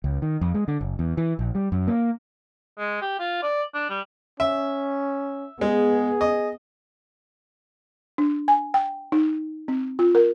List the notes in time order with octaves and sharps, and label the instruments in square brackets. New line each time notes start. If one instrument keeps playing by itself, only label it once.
[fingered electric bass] C#2
D#3
F2
G#3
D3
F#1
E2
E3
A#1
G3
F#2
A#3
[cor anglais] G#3
G4
F4
D5
D4
G3
[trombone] C#4 [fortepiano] E5
[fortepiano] G#3 [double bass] B3 [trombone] G#4
[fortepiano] D#5
[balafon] D4
G#5
G5
D#4
C4
F4
A#4